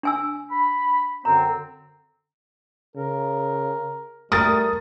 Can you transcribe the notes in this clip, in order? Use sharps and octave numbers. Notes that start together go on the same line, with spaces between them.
D4 G#5 E6
B5
F#2 D3 C4 A#5
C#3 A#4
G3 A3 A#4 D#6 A6